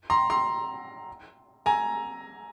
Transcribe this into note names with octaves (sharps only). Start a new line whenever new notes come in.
A#5 C6
A#5 C6
G#5 A#5